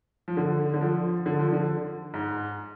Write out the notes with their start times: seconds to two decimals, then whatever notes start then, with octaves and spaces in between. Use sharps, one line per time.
0.28 F3
0.37 D3
0.74 D3
0.81 F3
1.26 D3
1.39 F3
1.52 D3
2.14 G#2